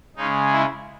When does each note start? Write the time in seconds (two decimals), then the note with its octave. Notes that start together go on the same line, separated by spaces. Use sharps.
0.16 C#3 G#3 C#4 D#4
0.52 E4